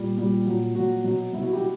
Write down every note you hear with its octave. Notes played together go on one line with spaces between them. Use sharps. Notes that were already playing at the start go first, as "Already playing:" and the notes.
Already playing: A#2 G3
A#2 G3
A#2 F#3
A#2 F#3 F#4
B2 F#3
B2 F#3 E4
F#4
E4 G4